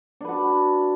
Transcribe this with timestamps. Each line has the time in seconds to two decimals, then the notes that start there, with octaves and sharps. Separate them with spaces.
0.21 D4
0.25 B4
0.29 F#4